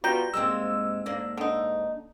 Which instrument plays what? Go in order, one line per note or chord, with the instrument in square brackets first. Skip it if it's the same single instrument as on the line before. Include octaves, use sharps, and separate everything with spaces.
[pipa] G3 [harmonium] B3 F4 F#4 [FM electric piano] A#5 G6
[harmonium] G#2 [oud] G#3 A#3 C4 [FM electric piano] E6
[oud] A#3 D4
[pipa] D3 D#4